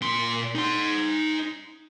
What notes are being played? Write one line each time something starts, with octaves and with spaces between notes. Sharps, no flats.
A#2 C6
D#4 C6